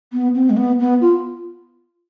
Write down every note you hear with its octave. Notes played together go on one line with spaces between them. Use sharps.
B3
C4
G#3
B3
B3
F4